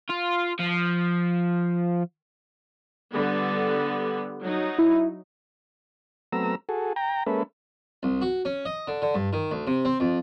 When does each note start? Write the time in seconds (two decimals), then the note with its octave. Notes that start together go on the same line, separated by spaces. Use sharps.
0.09 F4
0.59 F3
3.13 D3 G3 B3
4.41 F#3 D#4
4.78 E4
6.33 F#3 A3 B3 C4 A#5 E6
6.69 F#4 G#4 A4
6.96 G5 A#5
7.27 G#3 A#3 C#4 A4 B4 E5
8.03 C2
8.22 F#4
8.45 C#4
8.65 D#5
8.88 D3
9.02 D3
9.15 G2
9.33 D#3
9.51 D2
9.67 C3
9.85 C4
10.00 F2